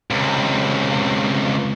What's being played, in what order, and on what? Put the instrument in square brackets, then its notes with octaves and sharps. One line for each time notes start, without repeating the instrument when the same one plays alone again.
[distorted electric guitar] C#2 C3